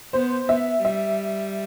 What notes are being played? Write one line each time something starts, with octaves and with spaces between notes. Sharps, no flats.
B3 C5
B3 E5
G3 E5